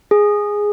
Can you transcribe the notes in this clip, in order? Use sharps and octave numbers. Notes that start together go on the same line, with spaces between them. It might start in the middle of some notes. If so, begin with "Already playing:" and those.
G#4